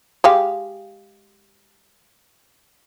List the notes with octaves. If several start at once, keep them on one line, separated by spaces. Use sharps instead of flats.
G#3 G4 F5